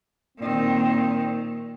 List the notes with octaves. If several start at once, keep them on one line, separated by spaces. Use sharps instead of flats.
A#2 D#3 C4